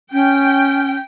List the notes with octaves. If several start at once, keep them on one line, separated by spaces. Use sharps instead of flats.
C#4 G5